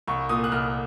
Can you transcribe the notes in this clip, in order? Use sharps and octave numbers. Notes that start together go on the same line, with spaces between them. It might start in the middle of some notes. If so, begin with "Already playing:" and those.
C2 C#6
A#2 D#6
F#6
C2 F6